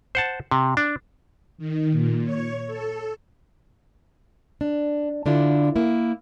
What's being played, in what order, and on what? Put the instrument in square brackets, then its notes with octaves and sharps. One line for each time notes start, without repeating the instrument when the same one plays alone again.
[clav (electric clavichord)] C5 F#5 A5
C3
D4
[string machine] D#3
A#2
C#5
A4
[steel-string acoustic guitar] D4
D3 D4 E4 F4
A#3 E4